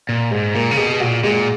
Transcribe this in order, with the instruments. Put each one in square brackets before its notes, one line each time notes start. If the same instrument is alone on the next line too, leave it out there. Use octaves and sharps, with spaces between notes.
[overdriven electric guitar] A#2
[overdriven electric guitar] G#2 [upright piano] G#3
[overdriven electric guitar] A#2 [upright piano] A#3
[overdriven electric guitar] C#3
[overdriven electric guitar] B2 [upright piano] G#4
[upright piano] G#4
[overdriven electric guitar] A#2 [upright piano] F#4
[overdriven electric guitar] A#2 [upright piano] G#3